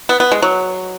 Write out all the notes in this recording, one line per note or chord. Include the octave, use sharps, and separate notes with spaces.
B3
B3
G#3
F#3